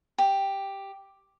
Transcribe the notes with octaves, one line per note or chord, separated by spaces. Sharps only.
G4